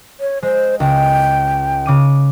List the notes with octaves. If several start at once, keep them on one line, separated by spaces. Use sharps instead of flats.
C#5
G#3 C5
C#2 G5
C#3 D6 D#7